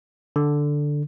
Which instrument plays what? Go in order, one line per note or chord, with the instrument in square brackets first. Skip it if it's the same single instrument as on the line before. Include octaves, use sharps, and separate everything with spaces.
[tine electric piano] D3